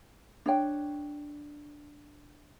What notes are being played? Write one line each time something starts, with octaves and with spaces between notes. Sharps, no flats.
D4 C#5 G5